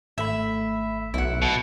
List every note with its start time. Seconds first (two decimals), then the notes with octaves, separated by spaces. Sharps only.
0.18 G#1 A3 E5 B5
1.14 B1 E4 F#5
1.42 B2